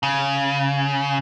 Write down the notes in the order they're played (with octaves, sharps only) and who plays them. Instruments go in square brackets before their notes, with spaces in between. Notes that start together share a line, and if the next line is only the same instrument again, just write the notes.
[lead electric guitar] C#3